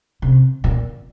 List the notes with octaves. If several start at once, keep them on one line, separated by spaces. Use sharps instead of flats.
C3
A#2